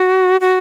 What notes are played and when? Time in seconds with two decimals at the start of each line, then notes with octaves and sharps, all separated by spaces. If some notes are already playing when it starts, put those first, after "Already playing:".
Already playing: F#4
0.41 F#4